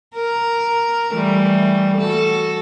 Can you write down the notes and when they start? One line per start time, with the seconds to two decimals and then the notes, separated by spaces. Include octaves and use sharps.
0.15 A#4
1.13 E3 G3 A3
1.97 F#4 A4